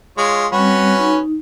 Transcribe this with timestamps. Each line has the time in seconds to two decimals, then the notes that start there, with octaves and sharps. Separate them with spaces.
0.18 G#3 F4 C#5
0.52 G3 C4 C#4 F#4 B4
0.99 D#4